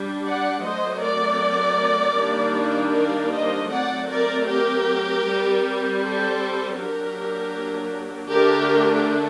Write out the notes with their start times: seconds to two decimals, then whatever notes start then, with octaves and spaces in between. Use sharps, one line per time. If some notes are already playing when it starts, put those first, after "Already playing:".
Already playing: G3 D4
0.26 D5 F#5
0.64 F#3 A3 C4 C5 D#5
1.03 A#4 D5
2.17 D#3 G3 A#3 D4
2.94 A#4 D5
3.32 C5 D#5
3.71 F#3 A3 C4 D5 F#5
4.09 A#4 D5
4.48 G4 A#4
5.25 G3 C4
6.01 A4 C5
6.77 F#3 A#3 D4 G4 A#4
8.30 D3 A3 D4 G4 A#4